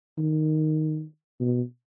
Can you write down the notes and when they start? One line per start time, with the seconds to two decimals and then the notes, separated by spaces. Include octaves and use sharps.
0.18 D#3
1.40 B2